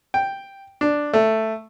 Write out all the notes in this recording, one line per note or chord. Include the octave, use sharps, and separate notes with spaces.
G5
D4
A3